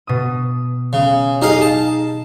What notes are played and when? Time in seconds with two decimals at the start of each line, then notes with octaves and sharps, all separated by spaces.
0.07 B2 D#6
0.93 C#3
1.42 D#4 G4 G#4 D#5 F5
1.62 A5